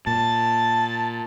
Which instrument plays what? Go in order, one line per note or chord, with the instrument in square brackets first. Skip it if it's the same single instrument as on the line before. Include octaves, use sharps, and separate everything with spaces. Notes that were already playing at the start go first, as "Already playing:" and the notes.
[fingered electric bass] A#2 [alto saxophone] A5